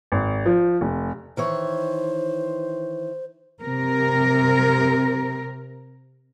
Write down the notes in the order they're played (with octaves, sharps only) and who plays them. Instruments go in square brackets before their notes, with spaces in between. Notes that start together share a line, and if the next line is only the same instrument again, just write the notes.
[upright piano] G#1
F3
F1
[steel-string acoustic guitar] D#3 E3 C#5 [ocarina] C5
[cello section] C3 A#4